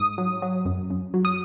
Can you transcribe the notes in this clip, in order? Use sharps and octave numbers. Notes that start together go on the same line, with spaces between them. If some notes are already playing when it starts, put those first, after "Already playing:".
Already playing: G#2 D#6
F#3
F#3
F#2
F#2
F#3
D#6